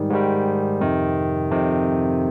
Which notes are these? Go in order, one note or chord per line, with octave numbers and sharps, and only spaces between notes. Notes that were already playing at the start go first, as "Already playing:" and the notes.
Already playing: G#2 D#3 G3
G#2 D#3 G3
F2 C3 D#3
F2 C3 D#3